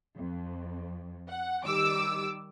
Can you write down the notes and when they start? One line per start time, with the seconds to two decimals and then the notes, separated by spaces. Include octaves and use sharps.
0.17 F2
1.29 F#5
1.64 D#3 G3 D6 E6